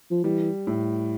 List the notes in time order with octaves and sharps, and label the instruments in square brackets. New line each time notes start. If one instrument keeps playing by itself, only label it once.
[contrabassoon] F3
[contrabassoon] E3 [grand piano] G3
[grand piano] A2